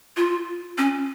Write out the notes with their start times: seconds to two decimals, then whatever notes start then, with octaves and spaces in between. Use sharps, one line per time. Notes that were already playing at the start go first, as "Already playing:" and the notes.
0.17 F4
0.78 C#4